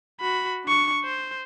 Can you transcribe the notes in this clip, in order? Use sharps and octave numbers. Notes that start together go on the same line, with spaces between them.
F#4 B5
D4 C#6
C5